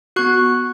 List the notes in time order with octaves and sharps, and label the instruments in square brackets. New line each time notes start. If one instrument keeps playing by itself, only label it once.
[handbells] B3 F#4 C#6 F#6